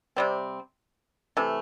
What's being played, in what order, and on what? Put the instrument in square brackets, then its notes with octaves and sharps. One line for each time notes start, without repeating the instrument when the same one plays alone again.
[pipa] C3 G3 C4
C3 E3 A3